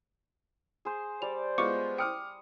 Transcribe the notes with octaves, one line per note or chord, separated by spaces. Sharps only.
G#4 C5
G3 C5 D5 F7
G#3 B3 F4 C#6 D6 C#7
G5 D6 D#6 F6 C#7